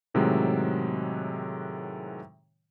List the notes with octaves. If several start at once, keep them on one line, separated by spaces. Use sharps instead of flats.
A2 C3 D#3 F#3 G#3